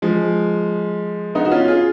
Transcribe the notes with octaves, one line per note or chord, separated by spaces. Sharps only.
F3 G#3
B3 D#4
F#4
C#4 F4
F4 G#4